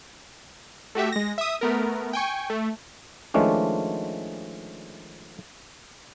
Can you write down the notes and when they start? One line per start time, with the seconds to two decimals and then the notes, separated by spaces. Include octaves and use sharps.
0.95 A3 F#4 G4 E5
1.12 G#3 A#6
1.38 E5 D#6
1.61 A3 B3 A#4
2.13 G5 G#5 C#6
2.50 A3
3.34 D#3 F3 G#3 A3 C#4 D4